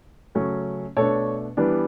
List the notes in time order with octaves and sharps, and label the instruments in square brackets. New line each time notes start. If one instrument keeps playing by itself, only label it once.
[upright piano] C#3 F#3 A3 C#4
B2 A3 D4 A4 C#5
E3 G3 B3 D4